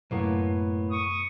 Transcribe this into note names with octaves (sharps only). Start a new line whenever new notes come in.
F#2 A2 C3 F#3 A#3 B3
C#6 D#6